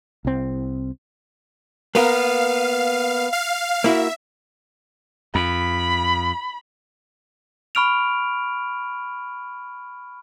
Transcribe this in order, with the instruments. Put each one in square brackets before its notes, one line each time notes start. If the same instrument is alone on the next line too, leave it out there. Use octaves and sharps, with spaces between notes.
[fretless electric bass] C2 C4
[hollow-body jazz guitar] A#3 B3 A#4 [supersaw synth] F5
[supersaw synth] F5
[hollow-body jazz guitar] A#3 E4 F#4 [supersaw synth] E5
[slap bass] F2 [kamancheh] B5
[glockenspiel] B5 C#6 F6 D7 F7